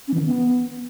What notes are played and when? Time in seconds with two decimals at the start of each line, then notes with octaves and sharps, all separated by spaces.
0.08 C#4
0.14 E3
0.20 D#3
0.26 B3